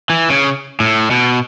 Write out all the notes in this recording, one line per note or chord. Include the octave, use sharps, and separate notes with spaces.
E3
C#3
A2
B2